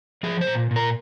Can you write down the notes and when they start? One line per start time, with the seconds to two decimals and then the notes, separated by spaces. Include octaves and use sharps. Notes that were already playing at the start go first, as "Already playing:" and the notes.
0.23 F3 G#4
0.41 C5
0.47 A#2
0.71 A#2
0.76 A#4